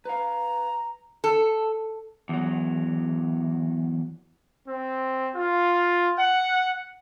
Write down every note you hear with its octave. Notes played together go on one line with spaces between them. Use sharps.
B4 F5 A#5
A4
E2 F#3
C4
F4
F#5